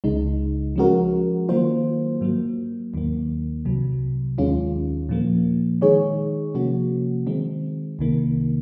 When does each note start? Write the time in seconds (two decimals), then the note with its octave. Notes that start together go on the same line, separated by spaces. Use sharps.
0.04 C#2 C#3 G#3 D#4
0.76 F3 G#3 C#4 F#4 A#4
1.49 D#3 F#3 A#3 F4 C5
2.21 G#2 F#3 A#3
2.94 D#2 D#3 A#3
3.65 C2 C3 F#3
4.38 D#2 D#3 G#3 C#4 F4
5.09 A#2 F3 A#3
5.81 D#3 G#3 D#4 G#4 C#5
6.54 C3 F3 A#3 C#4 F#4
7.27 D#3 G#3 C4
7.99 C2 C3 D#3 A#3